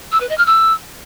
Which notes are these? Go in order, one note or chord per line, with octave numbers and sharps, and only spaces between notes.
E6
B4
D#5
F6
E6